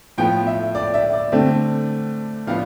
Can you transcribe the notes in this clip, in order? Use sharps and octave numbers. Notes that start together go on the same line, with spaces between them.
A2 F3 B3 G5
E5
D5
E5
D5
D3 A3 C4
A2 F3 B3 D4 F5